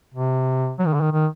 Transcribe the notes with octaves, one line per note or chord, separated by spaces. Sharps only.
C3
F#3
D#3
D3
D#3
D#3